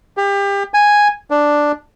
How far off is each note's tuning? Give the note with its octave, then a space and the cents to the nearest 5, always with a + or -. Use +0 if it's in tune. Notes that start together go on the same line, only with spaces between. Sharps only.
G4 +30
G#5 -5
D4 +0